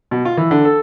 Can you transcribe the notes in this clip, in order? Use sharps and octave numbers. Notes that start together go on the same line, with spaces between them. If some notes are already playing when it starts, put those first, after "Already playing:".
B2
F4
E3
D3
A4